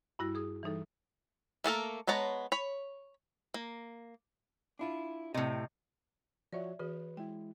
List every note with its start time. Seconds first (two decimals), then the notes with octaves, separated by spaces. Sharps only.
0.19 G2 G3 E4 F#4 A#6
0.35 G#4 D#6
0.63 E3 G3 D#4 A4
1.64 A3 A#3 A4 A#4
2.07 G#3 B3 C#5 A5 A#5
2.52 C#5 B5
3.54 A#3
4.79 D4 E4 F4
5.34 A2 C3 D5 D#5
6.53 F3 F#4 C#5 D5 E5
6.79 E3 F#4 G#4 B4
7.17 G#3 E4 G5